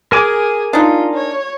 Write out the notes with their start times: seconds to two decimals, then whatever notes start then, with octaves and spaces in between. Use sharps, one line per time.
0.12 G#4 A#4 G#5 D6
0.73 D4 D#4 F4
1.14 C#5